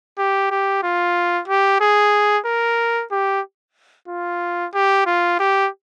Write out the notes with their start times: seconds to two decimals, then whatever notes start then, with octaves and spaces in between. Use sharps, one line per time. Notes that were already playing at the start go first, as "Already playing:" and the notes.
0.18 G4
0.51 G4
0.83 F4
1.48 G4
1.80 G#4
2.45 A#4
3.11 G4
4.08 F4
4.74 G4
5.06 F4
5.39 G4